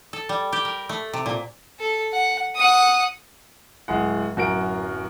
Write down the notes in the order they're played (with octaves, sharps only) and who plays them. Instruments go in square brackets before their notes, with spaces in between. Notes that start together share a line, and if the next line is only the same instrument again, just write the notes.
[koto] A4
G3
G4
A#4
A3
C3
A#2
[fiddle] A4
F#5
F#5 D#6
[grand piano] D1 G#3 F#5
D1 F#2 F#4 A#4 D7